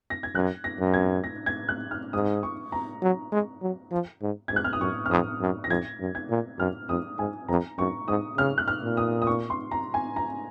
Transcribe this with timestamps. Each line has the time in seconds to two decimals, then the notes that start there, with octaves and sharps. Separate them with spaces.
0.10 A#6
0.23 G#6
0.35 F#2 F#6
0.64 A#6
0.79 F#2
0.94 G#6
1.24 A#6
1.46 G#6
1.69 F#6
1.91 F6
2.13 G#2 D#6
2.43 C#6
2.72 A#5
3.02 F#3
3.32 G#3
3.62 F#3
3.91 F3
4.22 G#2
4.48 G#2 G#6
4.56 F#6
4.64 F6
4.73 D#6
4.80 F#2 C#6
5.06 F6
5.10 F2 D#6
5.41 F#2
5.64 A#6
5.70 F2 G#6
6.00 F#2
6.15 G#6
6.30 A#2
6.59 F#2 F6
6.89 F2 D#6
7.19 G#2 G#5
7.48 F2 A#5
7.78 F#2 C#6
8.08 G#2 D#6
8.38 C#3 F6
8.58 F#6
8.68 F6
8.83 A#2
8.97 D#6
9.22 D#6
9.27 C#6
9.50 C6
9.71 A#5
9.94 G#5
10.16 A#5